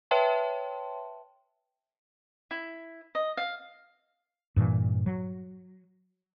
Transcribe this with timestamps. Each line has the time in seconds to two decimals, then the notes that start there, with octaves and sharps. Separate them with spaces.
0.11 B4 C#5 E5 G5 A5 C6
2.51 E4
3.15 D#5
3.37 F5
4.56 G2 A#2 E3
5.06 F#3